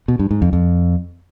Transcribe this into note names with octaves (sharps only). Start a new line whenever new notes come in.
B2
G2
G#2
F2
F2